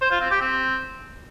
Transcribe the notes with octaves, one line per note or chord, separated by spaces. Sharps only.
C5
F4
C4
G4
C4